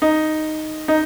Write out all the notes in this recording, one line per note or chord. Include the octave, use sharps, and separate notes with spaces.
D#4
D#4